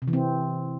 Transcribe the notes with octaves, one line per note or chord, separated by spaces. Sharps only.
C3
E3
C4